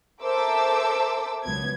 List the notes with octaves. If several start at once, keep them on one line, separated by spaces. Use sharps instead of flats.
A4 A#4 C5 E5 D6 E6
C#2 F#3 B3 G#6